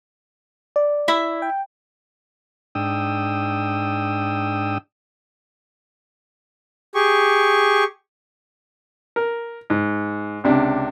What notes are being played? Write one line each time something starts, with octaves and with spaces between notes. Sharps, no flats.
D5
E4 E5
G5
G#2 D4 G5 D#6 E6
G4 G#4 C#6
A#4
G#2
C#2 C3 D4